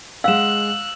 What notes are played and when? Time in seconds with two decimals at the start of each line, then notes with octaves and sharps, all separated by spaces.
0.24 G#3 F5 F#5 E6 F#6 E7